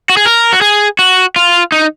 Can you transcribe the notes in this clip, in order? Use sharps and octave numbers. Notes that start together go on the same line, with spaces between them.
F#4
G#4
A#4
F#4
G#4
F#4
F4
D#4